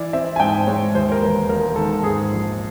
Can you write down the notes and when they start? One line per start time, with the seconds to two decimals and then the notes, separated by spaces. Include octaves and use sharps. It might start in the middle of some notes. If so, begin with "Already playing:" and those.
Already playing: E3 D5
0.13 C4 E5
0.36 G#5
0.40 G#2 G5
0.67 G#3 C#5
0.95 D#2 C5
1.12 A#4
1.22 E1 B4
1.49 E1 A#4
1.76 D#3 A4
2.03 G#2 G#4
2.31 A#1